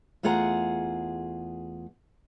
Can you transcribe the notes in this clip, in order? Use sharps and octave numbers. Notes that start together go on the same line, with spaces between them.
E2 A3 F4 G#4 F#5 A#5